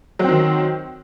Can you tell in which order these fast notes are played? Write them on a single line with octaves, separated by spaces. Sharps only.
F#3 C4 D#3